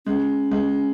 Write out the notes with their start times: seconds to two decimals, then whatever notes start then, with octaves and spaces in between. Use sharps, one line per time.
0.06 G#3 C#4
0.51 G#3